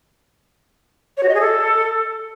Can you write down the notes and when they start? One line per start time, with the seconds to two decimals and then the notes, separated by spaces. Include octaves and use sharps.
1.17 C#5
1.23 F#4
1.29 D#5
1.35 G#4
1.40 A4